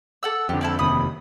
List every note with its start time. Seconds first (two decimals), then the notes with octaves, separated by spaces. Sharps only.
0.23 A4 F#5 E6
0.49 F2 D3 G4
0.61 C4 E4 A4
0.79 F1 D#2 C3 B5 D#6